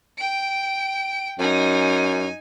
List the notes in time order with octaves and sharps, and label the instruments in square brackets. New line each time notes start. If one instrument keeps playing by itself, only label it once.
[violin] G5 D7
[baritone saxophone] F#2 [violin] D#4 G#5